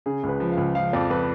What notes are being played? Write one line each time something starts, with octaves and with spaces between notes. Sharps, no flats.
C#3 G#4
C#2
B4
F3
F5
C#2
F3 F5
F2 D5
F2 B4